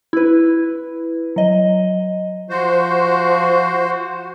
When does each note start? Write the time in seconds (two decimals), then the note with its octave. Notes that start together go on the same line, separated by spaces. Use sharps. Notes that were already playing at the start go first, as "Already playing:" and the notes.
0.13 E4 B4
1.36 F#3 D#5
2.50 F3 F#4 C5